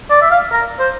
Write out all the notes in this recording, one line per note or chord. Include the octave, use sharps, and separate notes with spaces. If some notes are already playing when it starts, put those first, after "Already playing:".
D5
E5
F5
A#4
C5